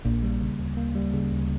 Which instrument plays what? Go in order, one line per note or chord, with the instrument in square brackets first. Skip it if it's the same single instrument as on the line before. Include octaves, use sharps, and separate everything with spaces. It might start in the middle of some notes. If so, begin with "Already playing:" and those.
[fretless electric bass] A#1 A#2 [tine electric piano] A#3
[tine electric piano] G3
C#3
D2
A#3
G3
C#3
D2